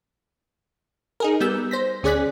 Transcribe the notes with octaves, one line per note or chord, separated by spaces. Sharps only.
D#4 G#4 A#4
G3 B3 E6 G6
C5 A#6 B6
D2 C#4 G#4 D5 F#6 B6